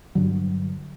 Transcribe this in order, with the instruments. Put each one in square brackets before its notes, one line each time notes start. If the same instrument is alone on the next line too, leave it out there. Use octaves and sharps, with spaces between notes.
[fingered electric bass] G2 D3 F#3